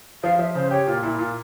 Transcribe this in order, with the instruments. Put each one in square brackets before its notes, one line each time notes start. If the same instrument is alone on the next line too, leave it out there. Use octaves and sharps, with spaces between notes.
[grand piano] F3 [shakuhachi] F5
[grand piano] F3 [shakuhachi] E5
[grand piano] C#3 [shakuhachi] C5
[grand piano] G4 [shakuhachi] C#5
[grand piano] A#2 [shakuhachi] F4
[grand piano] A#2 [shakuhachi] E4
[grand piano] A#2 [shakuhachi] F4